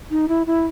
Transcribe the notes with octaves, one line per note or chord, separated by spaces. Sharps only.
D#4
E4
E4